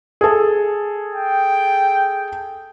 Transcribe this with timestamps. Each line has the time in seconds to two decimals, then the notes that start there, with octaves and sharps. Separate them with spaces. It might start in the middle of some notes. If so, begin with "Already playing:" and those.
0.21 G#4 A4
1.15 G5